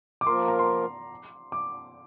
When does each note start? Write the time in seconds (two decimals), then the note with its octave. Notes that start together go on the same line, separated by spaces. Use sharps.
0.21 D6
0.27 F3 A#3 F4 A#4 C6
0.48 A#5
0.59 C6
1.52 D6